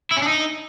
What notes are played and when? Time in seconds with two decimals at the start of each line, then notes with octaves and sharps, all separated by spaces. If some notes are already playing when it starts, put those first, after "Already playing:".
0.11 E4
0.17 C#4
0.22 D4
0.28 D#4